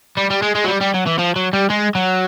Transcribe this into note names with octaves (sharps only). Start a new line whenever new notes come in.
G3
G3
G#3
G#3
F#3
G3
G3
F#3
E3
F3
F#3
G3
G#3
F#3